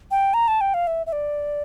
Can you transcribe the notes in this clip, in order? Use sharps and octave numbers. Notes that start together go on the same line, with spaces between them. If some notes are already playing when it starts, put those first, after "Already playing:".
G5
A#5
A5
G5
F5
E5
E5
D5